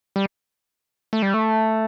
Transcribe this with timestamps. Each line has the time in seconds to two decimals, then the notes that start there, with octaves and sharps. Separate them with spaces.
0.16 G3
1.13 A3
1.22 G3
1.34 A3